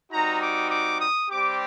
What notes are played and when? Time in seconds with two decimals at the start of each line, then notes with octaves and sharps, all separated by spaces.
0.12 G3 C4 D#4 F#4 A#5
0.42 D6
0.71 D6
1.01 D#6
1.30 G3 C4 G4 D6